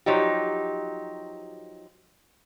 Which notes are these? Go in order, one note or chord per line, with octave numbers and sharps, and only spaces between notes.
F3 F#3 D#4 G4